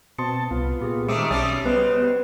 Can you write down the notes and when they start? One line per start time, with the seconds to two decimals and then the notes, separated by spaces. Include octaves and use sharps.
0.18 B2 C4 A5 C6 D#6 C#7
0.51 C2 B3 F4
0.82 A#2 G4 G#4
1.08 D#3 G#3 A3 C4 E5 D6 D#6 C#7
1.31 B1 G3 C4 C#4 A6
1.65 C#3 G3 B3 B4 C5 D#5